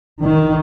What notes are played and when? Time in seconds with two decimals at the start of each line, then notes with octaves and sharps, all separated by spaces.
0.22 D#3